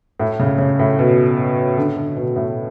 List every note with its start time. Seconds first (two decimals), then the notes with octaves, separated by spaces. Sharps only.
0.20 A2
0.40 C#3
0.58 C#3
0.79 A2
0.99 B2
1.77 D3
1.97 D3
2.16 B2
2.36 A2